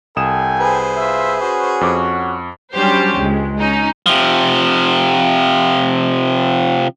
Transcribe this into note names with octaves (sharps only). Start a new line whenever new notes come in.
C2 A4 G5 G#5 D#6 E7
G#4 B4 C5
F4 E5
C#4 F#4
F2 D6
F#3 G3 C#4 D4 G4 C5
C#2 G#3
C#4 D#4
C3 F3